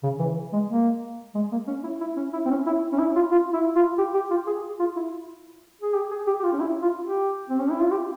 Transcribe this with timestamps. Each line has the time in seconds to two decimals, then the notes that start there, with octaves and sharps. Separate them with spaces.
0.03 C#3
0.19 E3
0.53 G#3
0.69 A#3
1.35 G#3
1.52 A#3
1.68 C#4
1.84 E4
2.01 E4
2.17 C#4
2.33 E4
2.46 C4
2.50 C#4
2.66 E4
2.93 C#4
2.99 E4
3.16 F4
3.32 F4
3.54 E4
3.76 F4
3.98 G4
4.14 G4
4.31 F4
4.47 G#4
4.80 F4
4.96 E4
5.81 G#4
5.94 G4
6.11 G#4
6.27 G4
6.40 G4
6.44 F4
6.53 C#4
6.60 E4
6.82 F4
7.04 G4
7.50 C4
7.60 C#4
7.71 E4
7.82 F4
7.91 G4